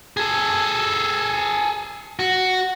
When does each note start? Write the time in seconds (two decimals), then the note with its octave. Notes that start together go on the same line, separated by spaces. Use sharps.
0.17 G#4 A4
2.19 F#4